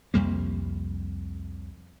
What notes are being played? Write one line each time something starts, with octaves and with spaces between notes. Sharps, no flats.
C2 F2 G3 A#3